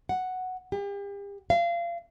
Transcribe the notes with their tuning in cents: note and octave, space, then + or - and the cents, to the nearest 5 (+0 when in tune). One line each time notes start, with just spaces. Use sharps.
F#5 +0
G4 +40
F5 -30